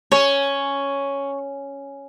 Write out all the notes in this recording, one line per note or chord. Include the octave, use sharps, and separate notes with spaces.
C#4 C#5